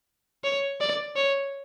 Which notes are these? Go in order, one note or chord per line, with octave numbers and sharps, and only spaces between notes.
C#5
D5
C#5